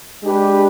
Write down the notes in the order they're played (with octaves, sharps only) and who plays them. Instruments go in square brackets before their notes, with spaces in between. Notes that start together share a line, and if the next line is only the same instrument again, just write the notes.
[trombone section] G#3 D4 G4 B4